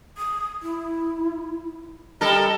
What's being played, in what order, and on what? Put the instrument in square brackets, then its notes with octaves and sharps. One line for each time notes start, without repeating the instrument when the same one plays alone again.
[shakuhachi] D#6
E4
[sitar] G3 A4 A#4 [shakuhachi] D#5